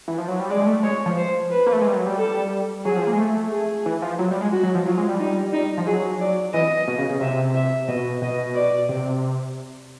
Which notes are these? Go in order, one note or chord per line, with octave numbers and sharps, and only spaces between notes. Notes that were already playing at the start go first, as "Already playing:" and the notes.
E3
F3
F#3
G3
G#3 D5
G#3
A3
G#3 C#5
F3
C5
B4
A#3
A3
G#3
G3
F#3
G3
A4
F#3 G#4
F3
A#3
G#3
A3
G#4
E3
F3
F#3
G3
G#3
F#4
F#3
F3
F#3 F4
G#3
G3
D#4
D#4
F3
F#3 G#4
D5
E3 D#5
B2
C#3
C#3
C3 E5
E5
B2 D#5
B2 D#5
D5
C3